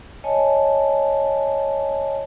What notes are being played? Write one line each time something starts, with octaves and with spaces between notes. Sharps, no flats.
C#5 D#5 G#5 A5